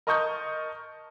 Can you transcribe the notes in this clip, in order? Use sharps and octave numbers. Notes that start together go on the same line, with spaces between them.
A#4 D#5 A5 C#6 D#6 G6